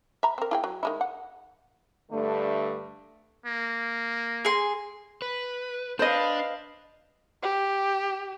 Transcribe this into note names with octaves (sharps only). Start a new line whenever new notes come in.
E5 A#5 B5
C4 A#4
E4 G#4 G5
F#3
D#3 G#3 E4
F#5
G2 D3 A3
A#3
G#4 C6
B4
D4 B4 C5 D#5 F5
G4